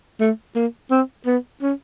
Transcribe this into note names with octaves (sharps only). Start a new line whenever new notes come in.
A3
A#3
C4
B3
C#4